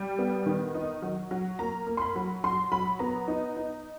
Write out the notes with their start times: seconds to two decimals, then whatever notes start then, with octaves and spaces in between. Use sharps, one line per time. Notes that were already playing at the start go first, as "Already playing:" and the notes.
Already playing: G3
0.19 B3
0.46 D#3
0.74 D#4
1.02 F#3
1.31 F#3
1.59 A#3 A#5
1.87 A#3
1.97 C6
2.01 B5
2.16 F#3
2.44 F#3 C6
2.72 F#3 B5
2.99 B3 A#5
3.28 D#4
3.57 D#4